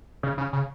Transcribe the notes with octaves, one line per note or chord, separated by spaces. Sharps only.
C#3
C#3
C#3